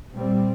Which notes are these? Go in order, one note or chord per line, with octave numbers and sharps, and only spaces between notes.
A#2 G3 C4